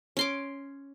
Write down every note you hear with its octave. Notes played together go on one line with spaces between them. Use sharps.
C#4 C6 D6